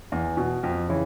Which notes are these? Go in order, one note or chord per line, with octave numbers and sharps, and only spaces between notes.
E2
B2
F2
C#3 E3